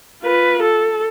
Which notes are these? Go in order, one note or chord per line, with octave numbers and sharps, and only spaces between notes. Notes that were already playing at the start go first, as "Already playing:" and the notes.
F4 B4
A4